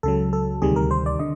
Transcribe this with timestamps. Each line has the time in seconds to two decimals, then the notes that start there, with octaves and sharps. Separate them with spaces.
0.03 C#2 C#3 F#3 A4
0.33 A4
0.62 D2 C3 D#3 G3 G#4
0.76 A#4
0.91 C5
1.06 D5
1.19 D3 D#5